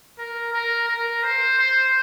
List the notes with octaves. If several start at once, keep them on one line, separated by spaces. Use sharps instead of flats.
A#4
A#4
A#4
C5
C5